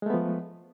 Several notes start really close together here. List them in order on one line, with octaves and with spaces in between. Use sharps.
G#3 A3 B3 F3